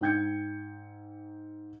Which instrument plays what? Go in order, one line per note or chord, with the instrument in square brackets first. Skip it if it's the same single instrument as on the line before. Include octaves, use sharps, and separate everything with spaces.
[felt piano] G#2 D#4 G5 G6 G#6 C#7